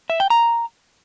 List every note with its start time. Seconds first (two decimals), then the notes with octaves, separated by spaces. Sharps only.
0.10 E5
0.20 G5
0.30 A#5